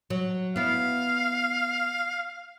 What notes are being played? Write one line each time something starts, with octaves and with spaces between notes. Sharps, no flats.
F#3
B3 E4 F5